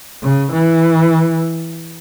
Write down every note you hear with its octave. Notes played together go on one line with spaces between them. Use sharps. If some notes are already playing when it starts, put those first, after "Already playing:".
C#3
E3